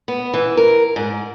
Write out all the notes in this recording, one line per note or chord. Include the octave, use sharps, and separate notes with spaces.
B3
E3
A#4
G#2